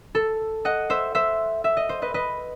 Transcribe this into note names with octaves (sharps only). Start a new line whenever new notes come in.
A4
D#5 F#5
C5 E5
C5 E5
E5
D#5
C5
B4 D#5
B4 D#5